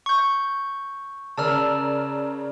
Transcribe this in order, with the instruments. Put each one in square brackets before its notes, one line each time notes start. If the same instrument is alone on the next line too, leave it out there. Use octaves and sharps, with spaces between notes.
[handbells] C#6 G6
[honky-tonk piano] C#3 A#4 D5 [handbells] A5 E6 F6